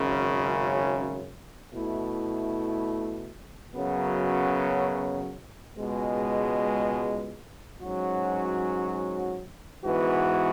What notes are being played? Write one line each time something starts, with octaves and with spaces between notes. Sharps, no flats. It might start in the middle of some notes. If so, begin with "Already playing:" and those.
Already playing: G#1 F#2 C#3
B2 A3 E4
F#2 C#3 F#3 B3
C#2 B2 G#3
G#2 F#3 C#4 F#4
G#2 E3 B3 F#4